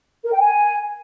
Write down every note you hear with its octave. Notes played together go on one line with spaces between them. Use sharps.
A#4
G5
G#5